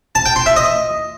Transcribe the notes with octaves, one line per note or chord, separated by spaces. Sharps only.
A5
G5
C6
E5
D#5